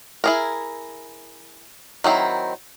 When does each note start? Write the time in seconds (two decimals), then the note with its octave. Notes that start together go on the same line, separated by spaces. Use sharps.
0.24 E4 G#4 A#4
2.04 D#3 F#3 C4 E4